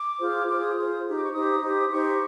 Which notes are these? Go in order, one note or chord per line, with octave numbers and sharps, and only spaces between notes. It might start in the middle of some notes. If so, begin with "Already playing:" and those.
Already playing: D6
F4 G#4 C5
F4 G#4 C5 D6
D#6
F4 G#4 C5
D#4 G4 C5
D6
C#6
D#4 G4 C5 D#6
D#4 G4 C5
D#4 G4 C5 C#6